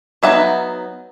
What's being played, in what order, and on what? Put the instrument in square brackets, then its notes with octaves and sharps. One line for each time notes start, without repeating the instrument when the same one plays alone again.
[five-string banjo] F#3 B3 D#4 E5